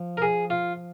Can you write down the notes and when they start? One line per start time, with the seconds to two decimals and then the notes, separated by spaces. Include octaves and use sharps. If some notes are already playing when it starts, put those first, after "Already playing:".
Already playing: F3
0.17 A#4
0.22 G#4
0.50 F4